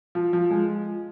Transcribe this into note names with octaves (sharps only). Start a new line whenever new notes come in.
F3
F3
G#3